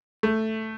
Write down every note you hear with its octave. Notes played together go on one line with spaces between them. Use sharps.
A3